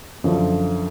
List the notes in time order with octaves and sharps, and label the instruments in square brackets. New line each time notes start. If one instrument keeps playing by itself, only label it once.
[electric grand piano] F#2 D3 F3